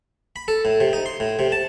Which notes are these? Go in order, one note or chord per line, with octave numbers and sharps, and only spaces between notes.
B5
A4
A2
C3
D#4
C6
A2
C3
A5